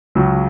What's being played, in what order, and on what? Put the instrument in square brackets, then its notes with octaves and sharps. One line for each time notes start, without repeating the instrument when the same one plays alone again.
[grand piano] C#2 C#3 F#3